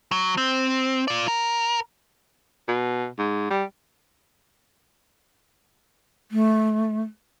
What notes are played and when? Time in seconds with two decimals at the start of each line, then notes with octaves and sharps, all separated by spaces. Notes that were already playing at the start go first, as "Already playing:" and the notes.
0.12 F#3
0.37 C4
1.08 F4 D5
1.28 A#4
2.68 B2
3.19 G#2
3.50 G3
6.31 A3